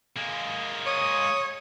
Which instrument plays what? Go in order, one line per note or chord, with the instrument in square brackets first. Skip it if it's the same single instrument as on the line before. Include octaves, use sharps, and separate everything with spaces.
[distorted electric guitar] G#3 A#3
[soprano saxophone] C#5 [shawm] D#6